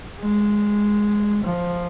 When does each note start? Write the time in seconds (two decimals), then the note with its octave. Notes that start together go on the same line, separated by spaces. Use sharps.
0.20 G#3
1.44 F3